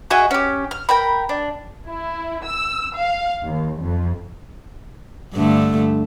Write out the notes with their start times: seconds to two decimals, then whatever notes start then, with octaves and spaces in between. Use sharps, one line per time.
0.11 F#4 G#4 D#5 E5
0.31 C#4 G4
0.71 F6
0.89 A#4 G5 B5
1.29 D4
1.89 E4
2.46 E6
2.98 F5
3.43 D#2
3.80 F2
5.34 G2 D3 A3